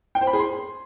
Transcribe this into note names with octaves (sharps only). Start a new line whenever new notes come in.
G5
C5
B5
G#4
C6